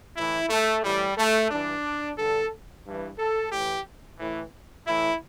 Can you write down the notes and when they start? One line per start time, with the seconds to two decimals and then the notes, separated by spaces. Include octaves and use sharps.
0.17 A2 E3 E4
0.49 A3
0.84 A2 E3 G3
1.17 A3
1.50 G2 E3 D4
2.18 G2 D3 A4
2.86 G2 E3
3.18 A4
3.52 A2 E3 G4
4.19 A2 E3
4.87 A2 E3 E4